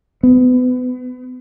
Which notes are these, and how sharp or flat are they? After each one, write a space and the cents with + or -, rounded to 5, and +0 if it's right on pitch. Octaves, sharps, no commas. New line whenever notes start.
B3 +30